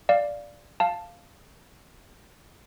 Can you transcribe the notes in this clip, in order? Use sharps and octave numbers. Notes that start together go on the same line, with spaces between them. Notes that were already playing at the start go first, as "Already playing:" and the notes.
D5 F5
F5 A5